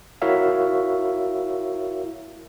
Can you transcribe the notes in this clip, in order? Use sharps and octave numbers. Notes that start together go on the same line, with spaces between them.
E4 F#4 A#4 C#5 E5 F5